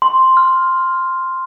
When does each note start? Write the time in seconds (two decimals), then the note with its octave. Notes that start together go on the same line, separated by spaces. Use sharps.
0.02 C6
0.37 F6